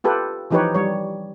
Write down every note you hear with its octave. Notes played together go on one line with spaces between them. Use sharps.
F4 G4 A4 B4
E3 F3 D#4 G4 B4 C#5
G3 C#5